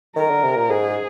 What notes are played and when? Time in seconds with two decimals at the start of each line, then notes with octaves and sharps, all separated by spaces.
0.16 D#3 A#4
0.30 D3
0.44 C3
0.56 A#2
0.69 G#2 G#4